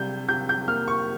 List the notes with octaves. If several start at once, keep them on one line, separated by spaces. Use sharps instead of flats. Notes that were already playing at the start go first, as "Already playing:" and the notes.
Already playing: C3 G3 G6
C3 G6
G6
A#3 F6
C#6